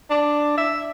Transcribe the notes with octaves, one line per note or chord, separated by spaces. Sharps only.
D4
E5